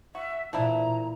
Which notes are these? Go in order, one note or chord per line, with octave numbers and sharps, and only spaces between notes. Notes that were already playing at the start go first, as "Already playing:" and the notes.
F#4 E5
A#2 E3 F3 D4 E4 A#5